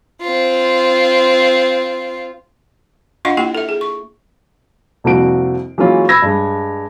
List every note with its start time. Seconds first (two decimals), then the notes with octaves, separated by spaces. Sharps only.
0.22 C4 F4
3.25 D4 F4 D#5 F5 F#5 C6
3.37 A#3 E4 F4 G4 G5
3.55 A4 E5
3.69 G#4
3.81 C#6
5.04 C2 F2 C3 A#3 F#4 D7
5.78 E3 F#3 G#3 A#3 C#4 F4
6.09 B5 E6 G#6 A#6
6.22 G2 G#3